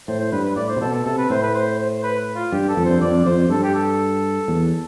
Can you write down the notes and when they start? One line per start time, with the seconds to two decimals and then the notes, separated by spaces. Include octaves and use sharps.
0.08 A2 C5
0.20 C5
0.32 G2 B4
0.44 B4
0.56 A2 D5
0.69 C5
0.76 C3
0.81 B2 A4
0.94 A4
1.06 C3 A4
1.18 B4
1.30 A2 C5
1.43 B4
1.54 C5
1.78 C5
2.03 B4
2.36 F4
2.52 G2 G4
2.69 A4
2.77 F2
2.85 G2 C5
3.01 F2 D5
3.25 F2 C5
3.49 G2 A4
3.63 G4
3.75 A4
4.48 E2